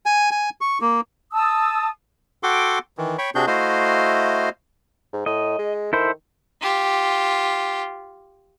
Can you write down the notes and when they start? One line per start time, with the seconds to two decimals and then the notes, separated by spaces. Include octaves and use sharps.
0.06 G#5
0.31 G#5
0.61 C#6
0.81 A#3
1.32 A5 D#6 E6
2.43 F#4 A4 F#5 G5 C6 D6
2.98 D#3 E3
3.18 C#5 G5 B5 C#6
3.35 C3 C4 D4 F#4 G#4 G6
3.47 A3 E4 F#4 C5 D#5 F5
5.13 G#2
5.26 A2 D#5
5.59 G#3
5.93 D#3 E4 A4 C5
6.61 F4 G4